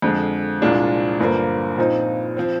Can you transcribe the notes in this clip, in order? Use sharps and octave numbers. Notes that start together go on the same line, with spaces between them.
F2 D3 G#3
C2 A#2 G#3 D4 F4
G1 G2 F3 A#3
A#2 F3 C4 D#4
F3 C4